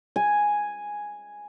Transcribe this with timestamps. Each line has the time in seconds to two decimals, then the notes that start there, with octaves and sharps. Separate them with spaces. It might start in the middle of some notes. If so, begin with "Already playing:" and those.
0.16 G#5